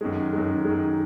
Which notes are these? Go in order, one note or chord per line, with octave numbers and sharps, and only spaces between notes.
F#2 D#3 G#3
F#2 D#3 G#3
F#2 D#3 G#3